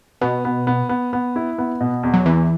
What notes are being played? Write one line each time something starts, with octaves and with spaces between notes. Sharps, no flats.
B2 B3
B3
B3
B3
B3
E4
B3
B2
E2
F#3
E2 E3